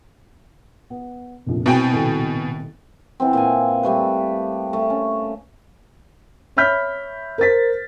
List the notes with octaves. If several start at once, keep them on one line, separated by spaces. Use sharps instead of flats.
B3
F1 A#1
C2 B2 C4 G5 G#5 D7
D#1 C2 A4
E3 B3 C4
A#2 F5 G#5
G3 A3 B4
A3
C#4
C#5 E5 B5 F6 G6 B6
A#4 C5 A6 B6